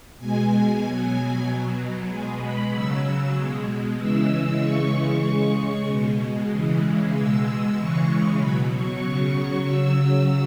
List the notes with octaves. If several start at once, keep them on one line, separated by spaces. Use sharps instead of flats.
B2 G#3 G#5
B2 F#3 G#5
B2 F#3
B2 G#3 G#5
B5
C#3 F#3 E6
B2 G#3
C#3 E3 G#3 E6
C#3 E3 G#3 C#6
C#3 G#3 C#6
B2 G#3
C#3 E3 G#3
B2 G#3 E6
C#3 E3 G#3 C#6
B2 F#3 B5
C#6
C#3 F#3 C#6
C#3 F#3 E6